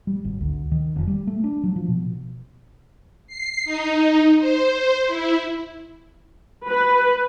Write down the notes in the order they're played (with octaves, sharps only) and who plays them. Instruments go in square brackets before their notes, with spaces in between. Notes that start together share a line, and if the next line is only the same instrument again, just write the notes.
[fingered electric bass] G3
G#1
D2
D#3
F1
G3
A3
D4
F#3
F3
B2
[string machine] C7
D#4
C5
C5
E4
[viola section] B4